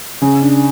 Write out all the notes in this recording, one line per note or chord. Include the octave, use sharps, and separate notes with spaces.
C#3
D4